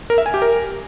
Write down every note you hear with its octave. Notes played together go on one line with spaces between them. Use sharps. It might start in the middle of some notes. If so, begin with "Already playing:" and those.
A#4
E5
G#5
G4
A#4